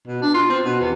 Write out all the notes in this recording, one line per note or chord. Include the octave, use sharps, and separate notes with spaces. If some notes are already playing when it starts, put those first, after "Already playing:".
B2
D4
F4
C4
B2
E2